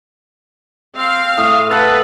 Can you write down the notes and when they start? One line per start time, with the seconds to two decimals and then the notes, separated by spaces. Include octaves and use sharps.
0.96 C4 F5
1.38 A2 D#6
1.71 A4 B4 F5 F#5 A5